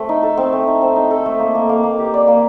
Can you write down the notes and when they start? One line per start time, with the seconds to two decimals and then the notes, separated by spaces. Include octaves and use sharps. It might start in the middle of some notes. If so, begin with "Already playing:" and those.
Already playing: A3 C4
0.09 D#4
0.23 A4
0.38 C4
0.53 A3
0.67 D#4
0.82 C4
0.96 D#4
1.11 A4
1.26 A3
1.39 A#3
1.55 A#3
1.69 A#3
1.84 A#3
1.99 G4
2.14 D5
2.28 A#3